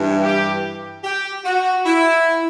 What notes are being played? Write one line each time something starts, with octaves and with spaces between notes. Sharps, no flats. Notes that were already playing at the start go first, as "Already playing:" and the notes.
Already playing: G2 E3
G4
G4
F#4
E4